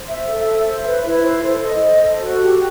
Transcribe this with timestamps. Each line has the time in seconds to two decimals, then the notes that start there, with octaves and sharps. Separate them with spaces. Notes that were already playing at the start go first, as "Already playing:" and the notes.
Already playing: C5
0.08 E5
0.28 A4
0.46 E5
0.66 C5
0.86 B4
1.05 E4
1.24 C5
1.43 A4
1.63 D#5
1.82 C5
2.02 A4
2.21 F#4
2.40 G4